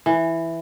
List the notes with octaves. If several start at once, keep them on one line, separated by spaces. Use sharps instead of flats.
E3